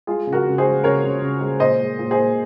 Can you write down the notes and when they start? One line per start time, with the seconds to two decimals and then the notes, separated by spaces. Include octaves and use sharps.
0.07 G#3 F4 G#4
0.27 C#3
0.33 F#4 A#4
0.46 C#3
0.58 G#4 C5
0.65 G#3
0.84 C#3 A#4 C#5
1.04 C#3
1.22 C#3
1.41 G#3
1.60 A#2 C5 D#5
1.80 G#3
1.99 A#2
2.11 G#4 C5
2.18 A#2